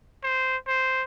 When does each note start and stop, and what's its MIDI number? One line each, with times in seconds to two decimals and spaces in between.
0.23 0.57 72
0.67 1.03 72